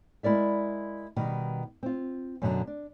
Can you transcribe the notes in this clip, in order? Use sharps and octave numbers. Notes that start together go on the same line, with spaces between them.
G#3 E4 A#4 D5 E5
B2 D#3 G3
C4 F4
F#2 B2 D3 D#3 F#3
D4